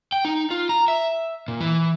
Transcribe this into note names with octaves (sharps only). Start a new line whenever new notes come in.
G5
D#4
F4
A#5
E5
A#2
E3